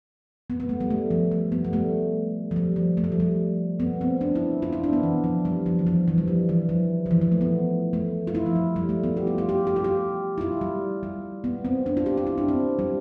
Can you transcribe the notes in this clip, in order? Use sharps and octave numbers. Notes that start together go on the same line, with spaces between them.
B3
B3
A3
G3
A3
F3
G3
B3
G3
A3
F3
G3
F3
A3
G3
F3
G3
B3
C4
D4
E4
F4
E4
D4
B3
E3
F3
G3
F3
E3
F3
E3
G3
F3
E3
F3
F3
E3
F3
A3
B3
A3
F4
E4
F3
G3
G3
A3
B3
G4
F4
F4
G4
G4
F4
G4
E4
F4
G3
G3
B3
C4
D4
F4
G4
F4
E4
D4
C4
G3